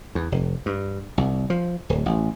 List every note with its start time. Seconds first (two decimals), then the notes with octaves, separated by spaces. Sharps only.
0.15 E2
0.32 F1
0.66 G2
1.18 C2
1.50 F3
1.89 D1
2.06 A1